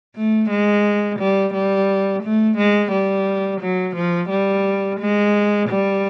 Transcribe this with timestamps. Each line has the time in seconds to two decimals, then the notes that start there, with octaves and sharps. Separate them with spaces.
0.15 A3
0.50 G#3
1.19 G3
1.54 G3
2.23 A3
2.57 G#3
2.91 G3
3.61 F#3
3.96 F3
4.30 G3
5.00 G#3
5.69 G3